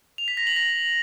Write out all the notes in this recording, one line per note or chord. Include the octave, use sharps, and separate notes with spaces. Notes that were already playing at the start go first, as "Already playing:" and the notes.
F7
B6
A#6
F#7
A#6